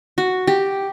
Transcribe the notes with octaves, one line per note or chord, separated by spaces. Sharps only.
F#4
G4